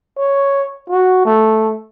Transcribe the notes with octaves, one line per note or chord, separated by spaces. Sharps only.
C#5
F#4
A3